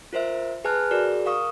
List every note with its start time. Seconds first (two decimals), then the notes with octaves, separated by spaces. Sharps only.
0.13 F4 A#4 C5 E5
0.64 G#4 B4 G#5 A5 F6 F#6
0.91 F#4 G#4 A#4 D5
1.26 A#4 F5 C#6 D#6